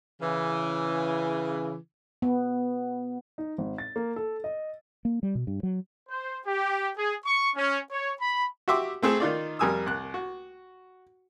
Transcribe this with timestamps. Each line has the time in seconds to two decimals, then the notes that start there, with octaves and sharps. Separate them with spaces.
0.22 C#3 E3
2.22 B3
3.38 D#4
3.58 G#1
3.78 A6
3.96 A#3
4.16 A4
4.44 D#5
5.05 A#3
5.23 G3
5.35 B2
5.47 G2
5.63 F#3
6.09 C5
6.46 G4
6.97 G#4
7.25 C#6
7.56 C#4
7.91 C#5
8.20 B5
8.68 F#4 G4 E5 C6 D6
9.02 A3 C4 G#4 A4
9.20 D#3 D#4 F4 D5
9.59 F2 G3 A#4 G#5 D#6 E6
9.86 C2 F#6
10.14 F#4